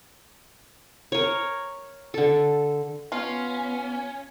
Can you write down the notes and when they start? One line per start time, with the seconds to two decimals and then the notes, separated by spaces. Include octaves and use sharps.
1.12 A#4 C#5
2.14 D3 A4
3.12 B3 C#4 F4